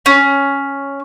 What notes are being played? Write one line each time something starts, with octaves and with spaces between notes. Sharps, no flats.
C#4